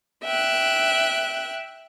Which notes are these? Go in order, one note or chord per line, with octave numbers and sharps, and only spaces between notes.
E5 G5 F#6